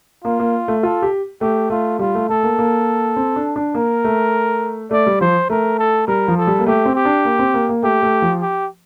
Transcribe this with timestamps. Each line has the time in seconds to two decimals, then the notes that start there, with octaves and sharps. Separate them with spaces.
0.24 A#3 F4
0.40 A#3
0.68 A3
0.83 F4 A4
1.02 G4
1.41 A3 G4
1.70 A3 F4
1.99 G3 F4
2.15 A3
2.29 A3 A4
2.43 A#3
2.59 A#3
3.17 C4
3.36 D4
3.56 D4
3.74 A#3 A#4
4.04 A3
4.91 A3 D5
5.07 G3
5.21 F3 C5
5.49 A3 A#4
5.78 A4
6.08 G3 A#4
6.28 F3
6.37 A4
6.47 G3
6.59 A#3
6.66 A3 G4
6.86 C4
6.95 G4
7.05 D4
7.25 A#3
7.39 C4
7.54 A#3
7.69 A#3
7.83 A3 G4
8.03 A3
8.22 F3
8.41 G4